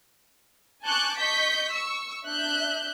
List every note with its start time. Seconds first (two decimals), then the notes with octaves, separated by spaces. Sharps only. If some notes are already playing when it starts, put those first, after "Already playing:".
0.83 G#5 A5 C#6 D6 F#6 G6
1.18 D#5 C#6 G6 B6
1.72 C#6 E6
2.25 D4 E5 F#6 G6